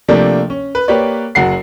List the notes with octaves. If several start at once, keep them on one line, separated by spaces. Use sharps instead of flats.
C3 F3 A3 A#3 D4
C#4
B4
A#3 G4 B4 C#5 D5
F#1 F#3 F#5 C7